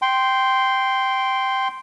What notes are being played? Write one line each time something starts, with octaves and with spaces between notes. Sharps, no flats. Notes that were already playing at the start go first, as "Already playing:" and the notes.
G5 C6